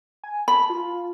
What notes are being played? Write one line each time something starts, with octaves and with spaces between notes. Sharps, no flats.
G#5
A5 B5
F4